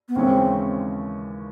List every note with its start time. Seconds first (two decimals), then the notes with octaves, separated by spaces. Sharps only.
0.09 B3
0.16 D#2 C#3 E3 G#3 C4 C#4